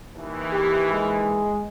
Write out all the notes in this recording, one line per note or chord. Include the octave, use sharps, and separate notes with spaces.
D#2 E3
G4
G#3